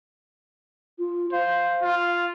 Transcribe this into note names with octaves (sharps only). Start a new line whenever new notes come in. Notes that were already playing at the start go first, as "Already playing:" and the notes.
F4
C5 F5
F4